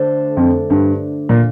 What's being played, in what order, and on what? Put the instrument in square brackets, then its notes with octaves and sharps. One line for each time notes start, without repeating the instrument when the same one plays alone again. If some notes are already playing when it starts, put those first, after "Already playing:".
Already playing: [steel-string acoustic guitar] D3 A3 D4 A4 C5
[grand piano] F2
G2
A#2